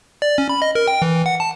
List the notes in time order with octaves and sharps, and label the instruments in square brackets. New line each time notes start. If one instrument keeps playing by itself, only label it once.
[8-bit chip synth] D5
C#4
B5
D#5
A#4
G5
E3
F#5
A5